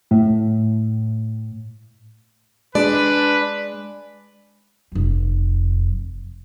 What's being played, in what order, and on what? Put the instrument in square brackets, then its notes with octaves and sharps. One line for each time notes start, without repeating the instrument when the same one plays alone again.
[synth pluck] A2
[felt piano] G#3 [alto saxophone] D4 [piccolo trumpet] B4 [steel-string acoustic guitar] D5
[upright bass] F1 F2